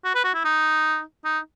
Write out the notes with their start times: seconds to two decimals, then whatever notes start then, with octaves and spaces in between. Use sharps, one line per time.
0.05 F#4
0.15 B4
0.24 F#4
0.34 E4
0.45 D#4
1.25 D#4